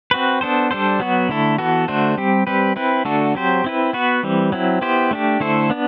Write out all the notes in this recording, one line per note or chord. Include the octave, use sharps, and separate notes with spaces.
C4 F#4 B4
B3 D4 A4 C5
G3 D4 A4 C5
F#3 B3 F#4
D3 A3 E4 A4
E3 B3 F#4 A4
D3 A3 D4 F#4 C5
G3 C4 G4
G3 C4 G4 B4
C4 E4 B4
D3 A3 D4 F#4 A4
F#3 C4 G4 C5
C4 E4 B4
B3 F#4 B4
E3 G3 C4
F#3 C4 E4
B3 E4 G4 C5
A3 D4 G4
D3 A3 E4 A4 C5
B3 D4